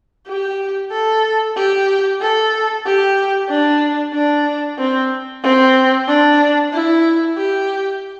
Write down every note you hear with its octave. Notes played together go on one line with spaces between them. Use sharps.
G4
A4
G4
A4
G4
D4
D4
C4
C4
D4
E4
G4